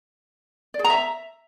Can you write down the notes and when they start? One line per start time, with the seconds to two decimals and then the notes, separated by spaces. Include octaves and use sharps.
0.74 D5
0.79 G#4
0.84 A#5
0.90 E5